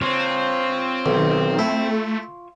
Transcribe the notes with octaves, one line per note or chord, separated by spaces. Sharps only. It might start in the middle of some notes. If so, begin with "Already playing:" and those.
C4 F4 C#5
B1 D#3
A3 E4